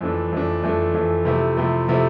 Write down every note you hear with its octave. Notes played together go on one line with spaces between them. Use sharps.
F2 E3 A3 D4
F2 E3 A3 D4
F2 E3 A3 D4
F2 E3 A3 D4
C3 F3 A3 E4
C3 F3 A3 E4
C3 F3 A3 E4